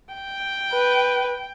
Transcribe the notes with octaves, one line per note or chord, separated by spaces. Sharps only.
G5
B4